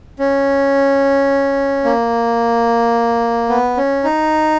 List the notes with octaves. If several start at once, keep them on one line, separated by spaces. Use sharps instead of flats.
C#4
A#3
B3
C#4
D#4